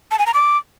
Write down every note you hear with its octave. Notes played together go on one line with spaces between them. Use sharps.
A5
G#5
A#5
D6